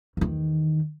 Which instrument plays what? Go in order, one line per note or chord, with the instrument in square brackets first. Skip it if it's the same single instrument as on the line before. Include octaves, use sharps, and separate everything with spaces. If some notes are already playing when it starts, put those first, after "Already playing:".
[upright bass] E2 D#3